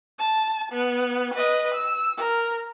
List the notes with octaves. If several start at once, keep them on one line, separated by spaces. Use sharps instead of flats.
A5
B3
B4 D#5
E6
A#4